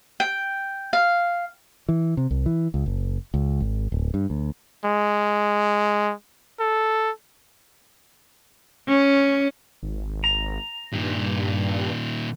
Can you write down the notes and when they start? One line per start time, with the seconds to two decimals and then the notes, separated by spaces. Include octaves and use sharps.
0.20 G5
0.93 F5
1.89 E3
2.17 C3
2.31 C2
2.46 E3
2.74 C#2
2.86 F#1
3.34 C#2
3.60 G#1
3.92 D1
4.14 G2
4.30 D2
4.85 G#3
6.60 A4
8.87 C#4
9.83 G#1
10.24 A#5
10.92 G2 A#2 D#3